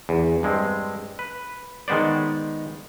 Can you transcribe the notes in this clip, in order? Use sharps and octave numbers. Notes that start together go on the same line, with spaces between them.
E2
G2 G#3 C4
B4
D#3 G#3 B3 C5 D5